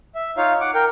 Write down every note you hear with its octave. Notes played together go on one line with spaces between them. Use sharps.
E5
D#4 F4 C#5 F5
F#5 D6
A#4 G5